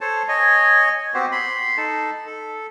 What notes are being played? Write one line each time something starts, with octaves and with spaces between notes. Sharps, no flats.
A4 C5 C#5 A5
C#5 D#5 G#5
B3 C4 F#4 G4 C5
B5 C6
D#4 A4 A5
A4